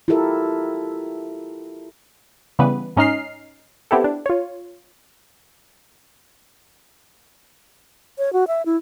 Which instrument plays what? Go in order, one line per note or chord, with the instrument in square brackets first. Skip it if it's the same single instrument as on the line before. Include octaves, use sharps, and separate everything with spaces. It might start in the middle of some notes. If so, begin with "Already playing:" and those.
[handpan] E4 F4 G4 A4 A#4 E5
[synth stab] C#3 E3 G3 B3 B4
G#2 C#4 D#4 D#5 F6 C7
B3 C4 E4 G4 A4
D4
F4 C#5
[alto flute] C#5
F#4
E5
E4